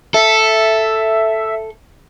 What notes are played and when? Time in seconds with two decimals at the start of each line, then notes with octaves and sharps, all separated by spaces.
0.14 A4 E5